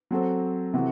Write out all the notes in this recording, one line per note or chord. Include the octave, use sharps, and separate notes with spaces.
F#3 C4 F#4 A4 C5
C3 E3 A3 C4 F#4